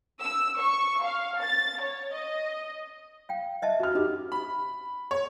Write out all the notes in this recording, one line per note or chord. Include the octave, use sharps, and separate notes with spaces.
E6
C#6
F5
A6
C#5
D#5
F5 G5
D#5 E5 A5
F#4 F6
D#4 G4
B5
C#5